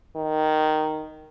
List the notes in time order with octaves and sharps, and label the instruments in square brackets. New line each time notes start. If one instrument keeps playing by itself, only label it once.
[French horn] D#3